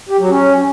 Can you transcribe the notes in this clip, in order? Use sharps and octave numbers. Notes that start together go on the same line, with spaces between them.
G4
F#3
C#4